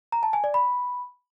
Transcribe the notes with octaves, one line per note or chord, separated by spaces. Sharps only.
A#5
A5
G#5
D5
B5